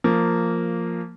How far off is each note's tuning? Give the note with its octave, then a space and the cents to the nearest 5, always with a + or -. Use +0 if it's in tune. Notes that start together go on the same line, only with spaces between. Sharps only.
F3 +0 A#3 -10